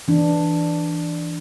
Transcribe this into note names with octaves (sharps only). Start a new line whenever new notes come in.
E3 D4